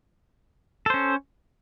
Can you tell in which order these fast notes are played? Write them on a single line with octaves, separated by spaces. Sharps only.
A4 C5 C#4